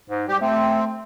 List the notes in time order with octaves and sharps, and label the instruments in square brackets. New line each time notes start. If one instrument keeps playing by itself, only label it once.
[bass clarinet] G#2
[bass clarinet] G3 [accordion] G4
[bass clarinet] A3 [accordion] C4